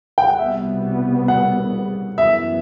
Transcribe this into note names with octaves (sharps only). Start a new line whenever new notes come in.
G5
F#5
C2 B2 G3 B3 E5
F#5
F#2 E3 B3 E5